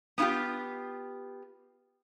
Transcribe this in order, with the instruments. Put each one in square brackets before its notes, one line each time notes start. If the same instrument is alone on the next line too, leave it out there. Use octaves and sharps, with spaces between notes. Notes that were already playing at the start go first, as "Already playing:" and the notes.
[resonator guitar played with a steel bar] B3 C#4 E4 F4 G4